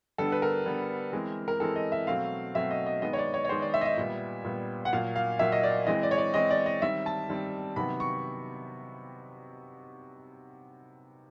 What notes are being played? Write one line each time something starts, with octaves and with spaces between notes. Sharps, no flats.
D3 G3 B3 A4
B4
A#4
D3 G3 B3
E3 G#3 C4
A#4
E3 G#3 C4 A4
D#5
E5
B2 F#3 A3 C4 F5
B2 F#3 A3 C4 E5
D#5
D#5
D#3 G#3 B3 D#5
C#5
D5
C#5
C#5
D#3 G#3 B3 C5
D5
E5
D#5
E5
A#2 G3 B3
A#2 G3 B3
F#5
A#2 F#3 A#3 F5
F5
A#2 F#3 A#3 E5
D#5
D5
E3 G#3 C4 D#5
D5
C#5
D5
E3 G#3 C4 D#5
D5
D#5
D#3 G3 C4 E5
A5
D#3 G3 C4
C3 D#3 F#3 B3 B5
C#6